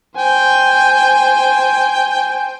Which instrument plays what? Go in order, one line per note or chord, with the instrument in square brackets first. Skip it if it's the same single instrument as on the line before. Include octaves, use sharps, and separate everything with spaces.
[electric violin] C5 G#5 [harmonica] G5